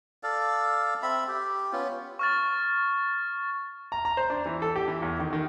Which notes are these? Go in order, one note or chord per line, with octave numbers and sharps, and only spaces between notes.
A4 D5 F5
C4 E5 B5
G4
B3 C#4 F4
C#6 F6 A6
A#5
A#5
C5
D4
E3
A4
G4
E3
E2
D#3
D#3